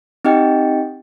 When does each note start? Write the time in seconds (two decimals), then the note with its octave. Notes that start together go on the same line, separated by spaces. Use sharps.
0.25 C4 D#4 G4 D#5 G5